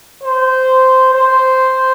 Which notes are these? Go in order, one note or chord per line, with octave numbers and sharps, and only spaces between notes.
C5
C5